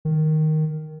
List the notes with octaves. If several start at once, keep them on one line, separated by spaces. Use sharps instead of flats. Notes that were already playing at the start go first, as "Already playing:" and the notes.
D#3